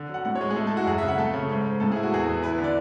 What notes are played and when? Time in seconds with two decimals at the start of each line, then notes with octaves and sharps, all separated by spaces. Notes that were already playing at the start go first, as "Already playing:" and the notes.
Already playing: D3
0.09 F#3 F#5
0.25 A2 F#5
0.35 C#5
0.41 G#3
0.50 G#4
0.56 A3 A4
0.67 A4
0.71 E4
0.77 F#4
0.83 A4
0.87 F#2 G#4
0.98 E5
1.02 C#3
1.08 F#5
1.18 A3 A4
1.34 C#3
1.49 G#2
1.65 G#2
1.80 A2 A4
1.92 E4 G#4
2.03 F#4
2.12 E2 G#4
2.28 E2
2.42 E4 B4
2.58 D3
2.64 D5